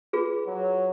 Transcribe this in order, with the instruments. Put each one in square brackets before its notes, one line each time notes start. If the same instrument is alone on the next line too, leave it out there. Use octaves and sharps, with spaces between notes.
[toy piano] F4 G#4 B4
[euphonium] F#3